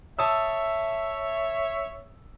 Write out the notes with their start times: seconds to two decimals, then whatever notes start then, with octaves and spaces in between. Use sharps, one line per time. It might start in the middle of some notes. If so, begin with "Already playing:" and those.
0.19 C#5 E5 A5 D#6 E6